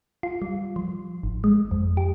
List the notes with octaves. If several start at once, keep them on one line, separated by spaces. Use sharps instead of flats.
F4
G3
F3
G#1
G#3
F2
G4